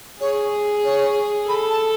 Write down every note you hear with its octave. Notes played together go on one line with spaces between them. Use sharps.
G#4 C#5
C#5
A4 B5
A5